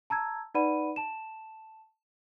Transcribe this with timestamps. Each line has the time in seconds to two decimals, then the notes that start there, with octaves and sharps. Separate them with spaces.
0.10 A5 A#5 E6 G#6
0.54 D#4 B4 D5 F#5 B5 D#7
0.96 A5 E7